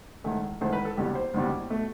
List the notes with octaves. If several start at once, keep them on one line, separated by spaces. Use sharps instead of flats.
E1 E2 D#3 A3
E1 E2 D#3 A3 C5
B4
A4
F#1 E2 B2 G3 G4
C5
F#1 E2 B2 G3
B2 A3